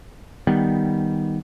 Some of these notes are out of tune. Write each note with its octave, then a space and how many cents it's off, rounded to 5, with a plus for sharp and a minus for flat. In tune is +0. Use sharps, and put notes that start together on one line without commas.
D#3 +0 G3 +0 B3 +0